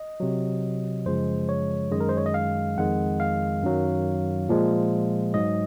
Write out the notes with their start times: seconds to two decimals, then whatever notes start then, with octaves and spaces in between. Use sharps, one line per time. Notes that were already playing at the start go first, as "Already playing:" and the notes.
Already playing: D#5
0.20 C3 F#3
1.06 F#2 C#3 F3 G#3 C5
1.49 C#5
1.92 F#2 D#3 G#3 D#5
2.01 A#4
2.09 C5
2.17 C#5
2.26 D#5
2.34 F5
2.77 F2 D#3 G#3 F#5
3.20 F5
3.62 F#2 D#3 F#3
4.49 A#2 F3 G#3
5.34 G#2 F#3 D#5